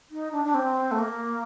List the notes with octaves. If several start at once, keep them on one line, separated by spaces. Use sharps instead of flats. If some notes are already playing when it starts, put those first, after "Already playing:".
D#4
D4
D4
C4
A3
A#3